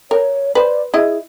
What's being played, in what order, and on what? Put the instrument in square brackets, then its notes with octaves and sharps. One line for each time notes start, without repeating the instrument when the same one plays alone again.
[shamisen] A#4 [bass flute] C#5
[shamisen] B4 C5 [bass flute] D5
[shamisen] E4 D#5 [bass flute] G#4